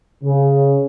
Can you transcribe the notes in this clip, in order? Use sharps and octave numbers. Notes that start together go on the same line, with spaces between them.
C#3